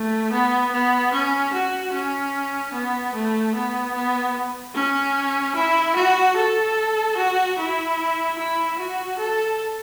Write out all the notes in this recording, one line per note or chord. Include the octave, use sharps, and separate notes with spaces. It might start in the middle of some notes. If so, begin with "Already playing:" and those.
Already playing: A3
B3
B3
C#4
F#4
C#4
B3
A3
B3
B3
C#4
E4
F#4
A4
F#4
E4
E4
F#4
A4